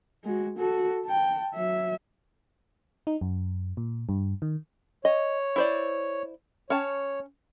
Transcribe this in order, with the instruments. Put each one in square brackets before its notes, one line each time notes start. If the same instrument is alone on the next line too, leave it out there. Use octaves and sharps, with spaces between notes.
[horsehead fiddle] G#3 F#4
F#4 A4
G5 A5
F#3 E5
[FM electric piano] D#4
F#2
A#2
G2
D#3
[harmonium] C#5 [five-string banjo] D#5
[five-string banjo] E4 C5 D5
[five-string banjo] C#4 A5 [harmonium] C#5